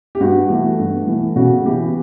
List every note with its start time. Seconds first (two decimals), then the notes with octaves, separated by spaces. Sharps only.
0.15 G4
0.20 G2 F#4
0.50 E3 A3
0.79 G2
1.07 E3 A3
1.36 C#3 F#4
1.65 E3 B3 G4